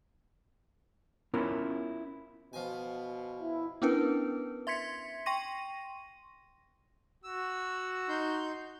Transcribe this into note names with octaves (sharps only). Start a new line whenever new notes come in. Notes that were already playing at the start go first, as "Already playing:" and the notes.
B3 C#4 E4 F4 A#4 C#5
B2 F3 G#5
E4
B3 C#4 D4 E4 A#4 B4
E5 C6 G#6 B6 C#7
G5 C6 C#6 A#6 D#7
F#4 E6
D#4 C6 G6